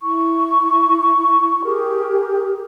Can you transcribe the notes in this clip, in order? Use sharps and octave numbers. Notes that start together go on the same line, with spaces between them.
E4 C#6
G4 G#4 A#4